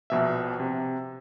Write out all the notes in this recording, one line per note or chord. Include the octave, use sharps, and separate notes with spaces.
A#1 B2 E5
C3